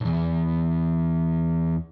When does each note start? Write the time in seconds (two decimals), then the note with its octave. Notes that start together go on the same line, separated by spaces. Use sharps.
0.01 B1 E2